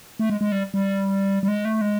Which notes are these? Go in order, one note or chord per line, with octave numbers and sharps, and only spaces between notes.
A3
G#3
G#3
G3
G3
G3
G#3
A3
G#3